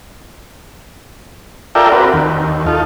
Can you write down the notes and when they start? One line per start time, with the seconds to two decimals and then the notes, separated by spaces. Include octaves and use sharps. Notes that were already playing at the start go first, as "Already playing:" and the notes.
1.75 F4 A4 A#4 D5 E5 G5
1.92 C4 F#4 A#4 B4
2.14 D#2
2.67 D#4 F4 A4